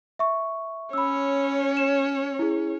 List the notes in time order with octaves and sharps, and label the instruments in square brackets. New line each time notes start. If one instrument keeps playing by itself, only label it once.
[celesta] E5 C#6
[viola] C#4 C#5 [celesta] B5 E6
[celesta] E7
E4 G#4